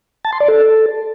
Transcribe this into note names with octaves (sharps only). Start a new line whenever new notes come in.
A5
C6
D5
A4